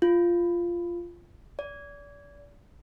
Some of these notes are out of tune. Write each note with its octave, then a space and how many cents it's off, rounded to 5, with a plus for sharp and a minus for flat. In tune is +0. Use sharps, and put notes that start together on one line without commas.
F4 -10
D5 -35